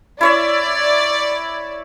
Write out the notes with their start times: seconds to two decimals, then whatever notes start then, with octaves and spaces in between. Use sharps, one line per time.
0.21 E4 C#5 D5 E5